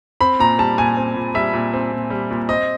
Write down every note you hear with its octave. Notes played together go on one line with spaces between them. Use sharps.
C4 B5
A#2 A#5
G3 A5
A#2 G#5
C4
A#2
G3 E5
A#2
C4
A#2
G3
A#2
C4 D#5